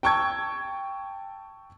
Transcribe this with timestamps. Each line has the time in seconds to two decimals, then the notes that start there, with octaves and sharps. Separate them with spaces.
0.03 G5 A5 C#6 E6 G#6